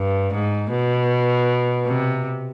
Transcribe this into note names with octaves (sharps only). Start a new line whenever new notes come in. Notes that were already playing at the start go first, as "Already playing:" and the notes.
Already playing: G2
G#2
B2
C3